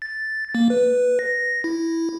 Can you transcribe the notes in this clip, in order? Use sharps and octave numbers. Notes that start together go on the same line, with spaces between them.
A6
A#3
B4
A#6
E4